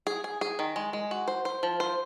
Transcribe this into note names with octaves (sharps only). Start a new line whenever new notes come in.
G#4
G#4
G#4
D#3
G#3
G#3
F#4
C5
C5
F3
C5